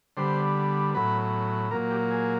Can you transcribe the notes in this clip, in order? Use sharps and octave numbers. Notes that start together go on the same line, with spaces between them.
D3 G3 B3 C5
A2 F#3 B3 B4
A#2 F#3 A#3 A#4
G4
G#4